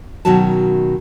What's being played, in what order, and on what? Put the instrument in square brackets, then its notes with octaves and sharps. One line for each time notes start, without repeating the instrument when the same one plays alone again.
[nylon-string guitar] B2 D#3 F#3 C#4 F#4 A5